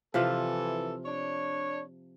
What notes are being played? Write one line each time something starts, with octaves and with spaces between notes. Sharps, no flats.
C3 E3 F3 F4 A4
D4 C#5